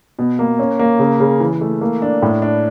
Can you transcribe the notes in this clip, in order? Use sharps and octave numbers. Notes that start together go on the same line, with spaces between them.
B2
A#3
C#4
A#3
C#3
C#3
E3
A3
A#3
D4
A2
D4